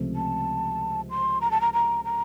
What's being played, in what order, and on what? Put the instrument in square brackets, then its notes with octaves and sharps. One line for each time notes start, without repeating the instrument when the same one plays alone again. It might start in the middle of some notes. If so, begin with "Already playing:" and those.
Already playing: [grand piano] C#2 C3 F3 A3 C4
[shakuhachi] A5
C6
A#5
A5
A#5
A#5
A#5